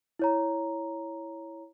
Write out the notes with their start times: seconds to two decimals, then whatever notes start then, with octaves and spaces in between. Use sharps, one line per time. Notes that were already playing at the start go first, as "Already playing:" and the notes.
0.19 E4 C#5 A#5